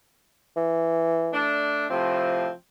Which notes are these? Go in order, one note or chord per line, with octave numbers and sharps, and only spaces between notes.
E3
A3 D4
A2 C3 F3 C4